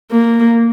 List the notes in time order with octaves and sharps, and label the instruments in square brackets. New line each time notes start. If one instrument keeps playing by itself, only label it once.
[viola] A#3